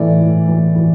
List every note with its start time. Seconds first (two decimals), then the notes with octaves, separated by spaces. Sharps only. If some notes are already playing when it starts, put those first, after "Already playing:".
Already playing: A2 E3 D5
0.20 A2
0.48 E3
0.76 E3